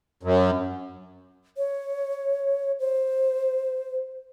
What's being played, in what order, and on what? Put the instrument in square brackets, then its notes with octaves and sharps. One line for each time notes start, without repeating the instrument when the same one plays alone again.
[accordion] F#2
[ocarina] C#5
C5